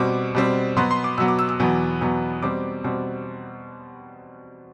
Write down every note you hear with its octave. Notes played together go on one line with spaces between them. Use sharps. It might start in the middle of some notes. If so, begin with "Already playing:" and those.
Already playing: B2 G3 C4 D6
B2 G3 C4
B2 F#3 B3 C6
C6
D6
B2 F#3 B3 E6
D6
E6
E6
E2 B2 F#3 B3
E2 B2 F#3 B3
B2 G3 C4 D6
B2 G3 C4